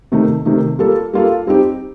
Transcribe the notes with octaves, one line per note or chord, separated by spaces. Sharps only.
C3 D#3 A3 D#4
C3 D#3 A3 D#4
G3 A#3 F4 A4
G3 A#3 F4 A4
G3 C4 D#4 G4